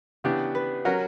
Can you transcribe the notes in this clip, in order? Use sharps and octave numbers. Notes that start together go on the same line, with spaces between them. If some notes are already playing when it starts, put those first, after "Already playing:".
C#3 E3 B3 D4 G4
B4
F#3 C#4 F#4 A#4